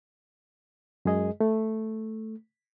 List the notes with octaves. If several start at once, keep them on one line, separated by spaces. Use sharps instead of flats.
F#2 G#3 G#4 D#5
A3